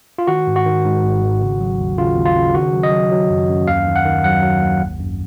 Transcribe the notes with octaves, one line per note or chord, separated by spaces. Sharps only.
F4
D#3 F#4
G#2
F#4
D#3
G#2
G#1
G#1
C#3
F#3
D#2
C#3 F4
D#2
F4
C#3
D#3 F#4
F#3
D#5
F#3
F#3
F#2
F#2
D#2 F5
D#3
F#5
D#3
F#3 F#5
F#3
D#2
G#1
F#2